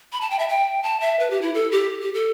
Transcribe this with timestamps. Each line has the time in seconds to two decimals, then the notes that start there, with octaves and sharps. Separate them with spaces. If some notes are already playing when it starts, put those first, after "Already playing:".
0.12 B5
0.21 A5
0.30 G5
0.39 E5
0.49 G5
0.83 A5
1.01 E5
1.20 B4
1.30 G4
1.42 E4
1.54 A4
1.72 G4
2.02 G4
2.14 A4